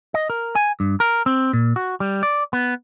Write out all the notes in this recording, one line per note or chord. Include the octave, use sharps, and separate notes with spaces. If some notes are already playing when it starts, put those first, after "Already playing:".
D#5
A#4
G#5
G2
A#4
C4
A#2
F#4
G3
D5
B3